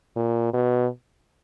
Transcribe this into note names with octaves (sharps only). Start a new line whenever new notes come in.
A#2
B2